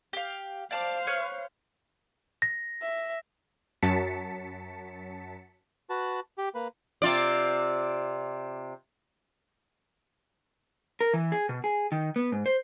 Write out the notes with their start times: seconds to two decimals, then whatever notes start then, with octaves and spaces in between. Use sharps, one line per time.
0.13 G4 F5
0.71 C5 D5 F5 A5 D6
1.07 B4 C#5 F6
2.42 A#6
2.82 E5
3.83 F#2 F#3 A5 B6 C#7
5.90 F#4 B4 A5
6.38 G4
6.55 A#3 B4
7.02 C3 F4 D5
11.01 A#4
11.14 E3
11.32 G#4
11.49 B2
11.64 G#4
11.92 D#3
12.16 B3
12.32 G#2
12.46 C5